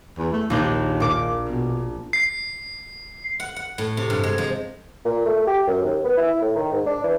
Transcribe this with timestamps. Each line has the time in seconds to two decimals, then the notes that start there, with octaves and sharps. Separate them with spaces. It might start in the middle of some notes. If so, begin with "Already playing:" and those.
0.18 E2
0.32 A3
0.50 A#1 D#2 D4 G6
1.00 A#2 D6
1.49 B2
2.13 C7
3.40 F#5
3.56 F#5
3.78 A2
3.97 C3
4.10 G2
4.23 G#3
4.38 F3
5.05 A#2
5.25 A3
5.47 G4
5.67 F#2
5.83 D#2
6.04 B3
6.17 E4
6.41 A2
6.56 D#3
6.72 G#2
6.86 D4
7.04 E3